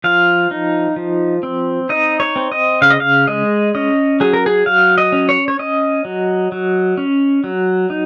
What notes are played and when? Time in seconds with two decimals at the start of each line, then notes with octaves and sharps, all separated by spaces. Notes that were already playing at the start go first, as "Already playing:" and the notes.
0.04 F3 F5
0.51 D#4
0.96 F3
1.43 C4
1.89 D#4 D#5
2.20 C#5
2.36 C4
2.52 D#5
2.82 C#3 F5
2.90 D#5
3.00 F5
3.27 G#3 D#5
3.75 C#4 D#5
4.20 F#3 G#4
4.33 A#4
4.46 G#4
4.66 F#3 F5
4.98 D#5
5.12 C#4
5.29 C#5
5.48 C#5
5.59 C#4 D#5
6.05 F#3
6.52 F#3
6.97 C#4
7.44 F#3
7.90 D#4